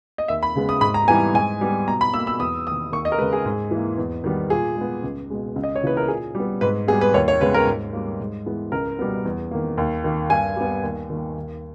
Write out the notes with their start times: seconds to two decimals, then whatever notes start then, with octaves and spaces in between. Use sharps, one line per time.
0.18 D#5
0.28 D#2 E5
0.43 B5
0.55 C#3 G#3 B3
0.69 D#6
0.81 G#2 B5
0.94 A#5
1.07 E3 G3 B3 G#5
1.34 G#2 G#5
1.61 G3 B3
1.88 B2 A#5
2.01 B5
2.14 A#3 E6
2.27 E6
2.39 E2 D#6
2.67 A#3 D#6
2.70 D#3
2.92 D#2 C#6
3.05 D#5
3.12 A#4
3.18 C#3 G#3 B4
3.33 G#4
3.45 G#2
3.71 E3 A#3
3.98 E2
4.24 D#3 G3 B3
4.50 A#2 G#4
4.76 G#3 B3
5.03 C#2
5.30 B2 G#3
5.56 C#2
5.63 D#5
5.76 C#5
5.83 C#3 E3 A#3 B4
5.97 A#4
6.08 A#2 G#4
6.35 G3 B3
6.61 G#2 B4
6.88 B3 G#4
6.92 G3
7.01 B4
7.14 D#2 C#5
7.28 C#5
7.41 C#3 G#3 B3 B4
7.54 A#4
7.67 G#2
7.93 G3 A#3
8.20 G#2
8.46 E3 G#3 B3
8.72 C#2 A#4
8.99 B2 G3 B3
9.25 E2
9.51 D#3 A#3
9.77 D#2
10.04 D#3 A#3
10.30 G2 G#5
10.56 G3 B3
10.83 D#2
11.10 D#3 A#3
11.36 D#2